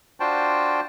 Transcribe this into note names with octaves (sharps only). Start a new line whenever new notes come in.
D4 F4 F#4 C5 G5 A5